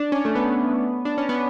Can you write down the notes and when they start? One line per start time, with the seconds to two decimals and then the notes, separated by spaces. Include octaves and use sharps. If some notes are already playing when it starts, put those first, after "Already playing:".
Already playing: D4
0.12 C#4
0.25 A3
0.35 B3
1.05 D4
1.18 C#4
1.29 B3